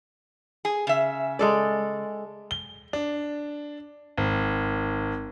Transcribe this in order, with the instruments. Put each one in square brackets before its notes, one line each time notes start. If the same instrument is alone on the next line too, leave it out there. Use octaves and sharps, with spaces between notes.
[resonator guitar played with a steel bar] G#4
C#3 E5
[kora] G#3 A4 D5
[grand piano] G7
D4
G#1